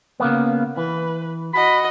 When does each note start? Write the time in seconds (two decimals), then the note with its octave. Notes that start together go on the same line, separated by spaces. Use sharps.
0.20 C#3 A#3 B3
0.77 E3 B4
1.54 F#4 D#5 B5